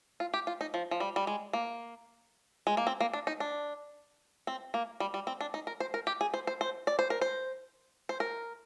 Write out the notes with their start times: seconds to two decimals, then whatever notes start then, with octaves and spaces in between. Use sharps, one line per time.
0.20 F4
0.34 G4
0.47 F4
0.61 D#4
0.74 F3
0.91 F3
1.00 G3
1.16 G3
1.27 G#3
1.53 A#3
2.67 G#3
2.77 A#3
2.87 C4
3.00 A#3
3.13 D4
3.27 D#4
3.40 D4
4.47 C4
4.74 A#3
5.00 G3
5.14 G3
5.27 C4
5.41 D4
5.54 D#4
5.67 A#4
5.80 C5
5.94 A#4
6.07 G4
6.21 G#4
6.34 C5
6.47 C5
6.61 C5
6.87 D5
6.99 C5
7.10 A#4
7.21 C5
8.09 C5
8.20 A#4